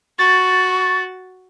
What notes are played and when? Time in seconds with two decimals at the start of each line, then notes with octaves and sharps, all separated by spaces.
0.19 F#4 C#6 A6